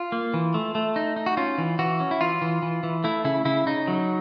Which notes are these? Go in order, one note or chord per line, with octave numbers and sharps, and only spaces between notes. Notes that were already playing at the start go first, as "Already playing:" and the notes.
Already playing: F4
A#3
E3
A3
A3
D#4
D#4
F#4
C#4 F4
E3
E3 F#4
C#4
E4
E3 F4
E3
E3
E3
A3 E4
C#3 E4
C#3 E4
C#3 D#4
F#3